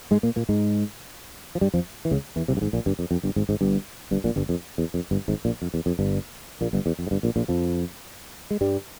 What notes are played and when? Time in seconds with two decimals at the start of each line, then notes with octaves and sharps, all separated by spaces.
0.11 G#2 G#3
0.23 A#2 A#3
0.36 A#2 A#3
0.49 G#2 G#3
1.55 F3
1.61 G2 G3
1.74 F2 F3
2.05 E3
2.11 C#2 C#3
2.36 E2 E3
2.48 C2 C3
2.57 G2
2.61 G#1 G#2
2.73 A#1 A#2
2.86 G1 G2
2.99 F2
3.11 F2
3.23 G1 G2
3.36 G#1 G#2
3.49 G#1 G#2
3.61 G1 G2
4.11 G1 G2
4.24 A#1 A#2
4.36 G1 G2
4.49 F2
4.78 E2
4.94 F2
5.11 G1 G2
5.28 G#1 G#2
5.45 A#1 A#2
5.62 F2
5.74 E2
5.86 F2
5.99 G1 G2
6.61 A#1 A#2
6.73 G1 G2
6.86 E2
6.99 F2
7.07 G#2
7.11 G1 G2
7.23 A#1 A#2
7.36 A#1 A#2
7.48 F2 F3
8.51 G#3
8.61 G2 G3